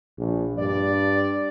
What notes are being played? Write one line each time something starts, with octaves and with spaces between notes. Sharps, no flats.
A#1
G2 D5